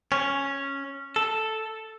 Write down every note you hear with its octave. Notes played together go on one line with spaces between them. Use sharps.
C#4
A4